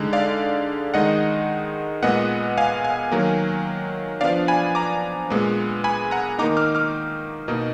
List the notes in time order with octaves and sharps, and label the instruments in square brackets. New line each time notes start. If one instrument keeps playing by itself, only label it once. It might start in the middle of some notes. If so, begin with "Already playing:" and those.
Already playing: [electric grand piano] D3 G#3 D#4
D5 F5
D#3 G#3 D#4 D#5 F#5
A#2 G#3 B3 D#5 F#5
F5 G#5
F5 G#5
D#3 F#3 A#3
F3 B3 D4 D5 F5
G#5 B5
A#5 D6
A#2 G#3 B3
G#5 B5
F#5 A#5
D#3 A#3 D#4 A#5 D6
D6 F6
D6 F6
B2 A#3 D#4